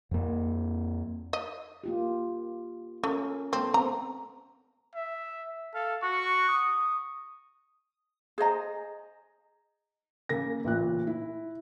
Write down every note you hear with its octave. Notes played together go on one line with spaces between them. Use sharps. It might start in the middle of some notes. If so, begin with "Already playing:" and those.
F2 A#3
D#5
A#3 F4 G4
A3 C#4 A#4
A3 B3 C4 A4
C4 A#5
E5
A4 F5
F#4 C#6
D#6
G#4 C5 D#5 A#5
C#3 A#3 A#6
A1 A#2 F#6
E4